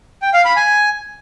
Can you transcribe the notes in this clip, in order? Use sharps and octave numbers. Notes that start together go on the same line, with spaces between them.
G5
F5
B5
G#5